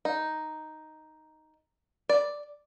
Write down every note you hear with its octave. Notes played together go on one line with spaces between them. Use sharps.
D#4
D5